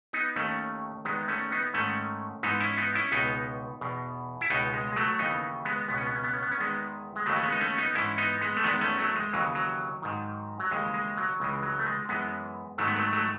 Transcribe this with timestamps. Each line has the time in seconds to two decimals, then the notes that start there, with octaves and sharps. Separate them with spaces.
0.13 B3 D#4
0.36 D#2 D#3 A3 C#4
1.05 E2 D#3 G#3 B3
1.28 A3 C#4
1.51 B3 D#4
1.74 G#2 D#3 A3 C#4
2.43 G#2 E3 B3 D#4
2.60 C#4 E4
2.78 B3 D#4
2.95 C#4 E4
3.12 C#2 B2 B3 D#4
3.81 E2 B2
4.41 E4
4.50 C#2 B2 B3 D#4
4.74 G#3
4.92 G#3
4.96 F#3 A3
5.19 D#2 C#3 E3 B3 D#4
5.65 G#3 B3
5.88 C#2 B2 B3
5.98 C#4
6.07 B3
6.15 C#4
6.24 B3
6.33 C#4
6.42 B3
6.51 C#4
6.58 E2 D#3 G#3 B3
7.16 G#3
7.26 D#2 C#3 E3 F#3 A3
7.36 C#4
7.43 G#3 B3
7.52 D#4
7.61 A3 C#4
7.78 B3 D#4
7.95 G#2 E3 C#4 E4
8.18 B3 D#4
8.41 G#3 B3
8.57 A3
8.64 E2 D#3 G#3 B3
8.81 A3 C#4
8.99 F#3 A3
9.16 G#3
9.33 D#2 C#3 E3 F#3
9.55 F#3
10.02 G#2 D#3
10.60 F#3
10.71 D#2 C#3 E3 G#3
10.94 G#3
11.17 F#3
11.40 C#2 C#3 E3 G#3
11.63 F#3
11.79 A3
11.86 G#3
12.09 F#2 E3 G#3 B3
12.78 G#2 D#3 F#3 A3
12.88 B3
12.96 F#3 A3
13.13 F#3 A3